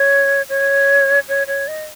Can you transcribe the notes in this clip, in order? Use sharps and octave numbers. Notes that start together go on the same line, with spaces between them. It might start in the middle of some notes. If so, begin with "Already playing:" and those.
Already playing: C#5
C#5
C#5
C#5
D#5